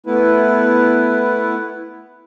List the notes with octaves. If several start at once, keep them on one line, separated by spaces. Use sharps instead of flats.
A3 B3 E4 B4